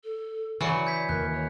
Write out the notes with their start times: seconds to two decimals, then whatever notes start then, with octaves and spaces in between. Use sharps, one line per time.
0.04 A4
0.61 C#3 E3 F#3 D5 G#5 C#7
0.87 G6 G#6 B6
1.09 D#2 A#4 F#6
1.33 C#5